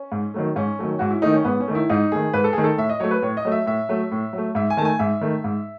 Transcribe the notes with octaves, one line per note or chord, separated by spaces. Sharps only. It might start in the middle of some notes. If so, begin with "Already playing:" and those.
Already playing: C#4
G#2
D#3 F#3 A3
G#2 C#4
D#3 F#3 A3
G#2 F#4
E4
D#3 A3 D#4
C#4
G#2 B3
C#4
D#3 A3
E4
G#2 D#4
D#3 A3 G#4
G#2 B4
A4
D#3 A3 G#4
A4
A2 E5
D#5
F#3 A3 C#5
B4
A2 C#5
D#5
F#3 A3
E5
A2 E5
F#3 A3
A2
F#3
A3
G#2 E5
G#5
D#3 A3 G#5 A5
G#2 E5
D#3 A3
G#2